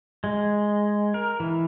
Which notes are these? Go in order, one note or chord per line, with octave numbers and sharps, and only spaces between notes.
G#3
A#4
E3